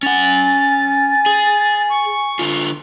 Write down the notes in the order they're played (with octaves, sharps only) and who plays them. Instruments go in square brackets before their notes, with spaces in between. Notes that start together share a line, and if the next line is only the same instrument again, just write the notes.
[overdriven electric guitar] C#4 F#5 [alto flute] G#5 [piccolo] A6
[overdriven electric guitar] G#4
[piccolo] C#6
[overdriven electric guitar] D3 F4